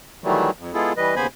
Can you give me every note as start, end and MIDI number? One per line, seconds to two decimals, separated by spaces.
0.24 0.51 51
0.24 0.51 52
0.24 0.51 54
0.24 0.51 55
0.24 0.51 57
0.59 0.72 41
0.74 0.93 56
0.74 0.93 59
0.74 0.93 64
0.74 0.93 65
0.74 0.93 68
0.74 0.93 69
0.97 1.15 52
0.97 1.15 55
0.97 1.15 71
0.97 1.15 75
1.16 1.27 39
1.16 1.27 49
1.16 1.27 59
1.16 1.27 72
1.16 1.27 80
1.16 1.27 83